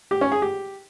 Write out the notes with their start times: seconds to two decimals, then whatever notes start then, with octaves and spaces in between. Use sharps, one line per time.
0.11 G4
0.21 C#4
0.32 G#4
0.42 G4